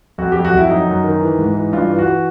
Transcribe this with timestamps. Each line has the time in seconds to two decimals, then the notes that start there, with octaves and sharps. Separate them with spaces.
0.18 F2 F#4
0.32 F2 G4
0.45 F#4
0.53 F2 E4
0.70 F#3 D#4
0.87 F#2
1.04 D#3
1.21 E3
1.39 G#2
1.55 E3
1.73 G2 F4
1.90 E3
1.98 F#4
2.07 E3